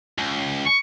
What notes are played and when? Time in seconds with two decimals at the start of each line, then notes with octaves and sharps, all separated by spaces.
0.19 C#2
0.66 C#6